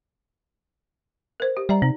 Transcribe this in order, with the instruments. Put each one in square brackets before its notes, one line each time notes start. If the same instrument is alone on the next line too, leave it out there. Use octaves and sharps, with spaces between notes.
[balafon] A#4 C5
G4
[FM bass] G3 [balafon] D5 E5 A#5
[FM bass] C3 [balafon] D#4